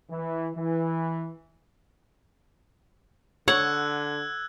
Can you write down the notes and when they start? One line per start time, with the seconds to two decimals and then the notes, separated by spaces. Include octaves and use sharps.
0.10 E3
0.56 E3
3.48 D3 C#5 F#5 E6 F#6 G#6